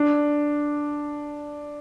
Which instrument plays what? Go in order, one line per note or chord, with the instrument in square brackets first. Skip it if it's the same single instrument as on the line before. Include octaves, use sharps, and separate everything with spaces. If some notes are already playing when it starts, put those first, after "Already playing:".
Already playing: [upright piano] D4